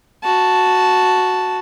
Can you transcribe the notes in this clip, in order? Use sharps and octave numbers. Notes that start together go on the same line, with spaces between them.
F#4 A5